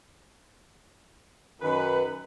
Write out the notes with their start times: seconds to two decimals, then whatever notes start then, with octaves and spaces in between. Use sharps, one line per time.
1.62 F#2 D#3 B4